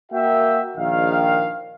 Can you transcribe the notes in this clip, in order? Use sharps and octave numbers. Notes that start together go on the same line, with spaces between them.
A#3 F#4 E5 G5
A#1 D#3 F5